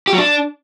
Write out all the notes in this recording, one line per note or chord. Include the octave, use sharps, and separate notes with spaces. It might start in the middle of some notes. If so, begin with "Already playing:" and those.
G4
F#3
D4